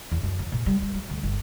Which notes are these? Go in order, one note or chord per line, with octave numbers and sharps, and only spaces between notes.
E2
F#2
F3
A#2
G3
G3
F#3
D2
G1